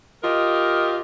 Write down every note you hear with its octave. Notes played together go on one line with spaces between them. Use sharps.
F4 G4 A#4 D#5